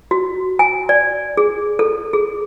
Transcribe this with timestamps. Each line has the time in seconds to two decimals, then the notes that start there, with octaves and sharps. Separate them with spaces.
0.11 F#4
0.59 G#5
0.89 D5
1.37 G#4
1.79 A4
2.13 G#4